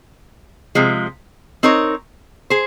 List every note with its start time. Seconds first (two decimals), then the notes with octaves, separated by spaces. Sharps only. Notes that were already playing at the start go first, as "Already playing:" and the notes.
0.75 C3 F3 G#3
1.63 C4 D#4 A#4 C#5
2.50 G#4 C5